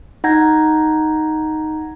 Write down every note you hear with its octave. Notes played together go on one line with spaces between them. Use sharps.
D#4 F#5 A#5 G6 G#6 A#6